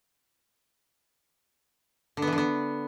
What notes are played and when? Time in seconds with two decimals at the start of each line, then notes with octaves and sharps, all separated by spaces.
2.17 D3
2.22 B3
2.27 E3
2.33 D3
2.38 B3